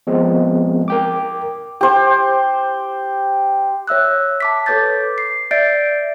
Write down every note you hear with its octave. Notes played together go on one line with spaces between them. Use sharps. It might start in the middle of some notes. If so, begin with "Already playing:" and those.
F3 G#3 B3 C4
A#4 G5 D6
G4 C5
C#5 E5 E6 F#6
A5 D6 B6
A4 B4 C#5 D6 G6 A6
C7
D5 E5 G6 A6 C7 D7